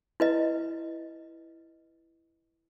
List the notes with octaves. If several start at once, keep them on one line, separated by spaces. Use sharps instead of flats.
E4 B4 D#5